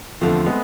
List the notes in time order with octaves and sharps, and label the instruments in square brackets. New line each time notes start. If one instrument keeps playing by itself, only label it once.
[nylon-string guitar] E2 D3 F3 [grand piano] A3 C4
[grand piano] G#3 B3